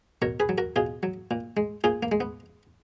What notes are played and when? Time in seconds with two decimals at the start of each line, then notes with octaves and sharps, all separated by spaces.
0.22 B2 A#4 C#5
0.40 G#4 B4
0.49 F#3
0.58 F#4 A#4
0.76 B2 F4 G#4
1.03 F#3
1.31 A#2
1.57 G#3
1.84 A#2 F4 G#4
2.03 A#3
2.12 G#3
2.20 B3